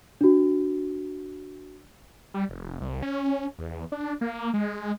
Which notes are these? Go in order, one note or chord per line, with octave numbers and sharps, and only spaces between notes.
D4 F#4
G3
F1
C2
C#4
E2
D4
A#3
G#3